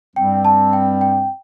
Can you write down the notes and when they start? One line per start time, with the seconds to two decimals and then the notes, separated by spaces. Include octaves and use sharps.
0.16 G2 G3 C4 G5
0.45 A5
0.73 G5
1.01 G5